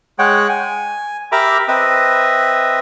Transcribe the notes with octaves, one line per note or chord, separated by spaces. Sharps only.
G#3 C#5 F#5 G5
G#5
G4 A#4 E5 A#5 B5 D6
C4 B4 D#5 E5